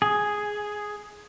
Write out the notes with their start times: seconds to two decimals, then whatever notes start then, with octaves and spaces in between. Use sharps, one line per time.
0.02 G#4